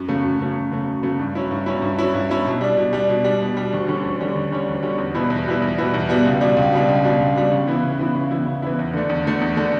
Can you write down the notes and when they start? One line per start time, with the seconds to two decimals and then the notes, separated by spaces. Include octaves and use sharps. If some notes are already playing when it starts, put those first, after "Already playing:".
Already playing: F#2
0.08 C#3 F#3 A3
0.24 F#2
0.39 C#3 F#3 A3
0.55 F#2
0.72 C#3 F#3 A3
0.88 F#2
1.03 C#3 F#3 A3
1.19 G2
1.35 F#3 C#4 E4
1.51 G2
1.66 F#3 C#4 E4
1.82 G2
1.98 F#3 C#4 E4
2.14 G2
2.29 F#3 C#4 E4
2.46 B2
2.61 G3 D4
2.77 B2
2.93 G3 D4
3.09 B2
3.24 G3 D4
3.41 B2
3.57 G3 D4
3.73 D2
3.88 D3 G3 C#4
4.03 D2
4.20 D3 G3 C#4
4.35 D2
4.51 D3 G3 C#4
4.68 D2
4.82 D3 G3 C#4
4.98 E2
5.15 B2 G3 B3 E4
5.30 E2
5.46 B2 G3 B3 E4
5.62 E2
5.78 B2 G3 B3 E4
5.94 E2
6.09 B2 G3 B3 E4
6.25 C#2
6.41 B2 G3 D4
6.57 C#2
6.72 B2 G3 D4
6.88 C#2
7.04 B2 G3 D4
7.21 C#2
7.35 B2 G3 D4
7.52 C#3
7.68 E3 B3 E4
7.83 C#3
7.99 E3 B3 E4
8.15 C#3
8.31 E3 B3 E4
8.46 C#3
8.62 E3 B3 E4
8.79 E2
8.93 D3 A3 D4
9.09 E2
9.25 D3 A3 D4
9.41 E2
9.57 D3 A3 D4